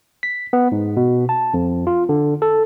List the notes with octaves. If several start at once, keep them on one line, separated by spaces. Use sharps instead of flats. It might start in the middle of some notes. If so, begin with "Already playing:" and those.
B6
B3
G#2
B2
A5
F2
F4
D3
A4